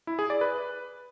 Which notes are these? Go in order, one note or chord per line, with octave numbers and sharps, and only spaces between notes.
E4
G#4
D5
B4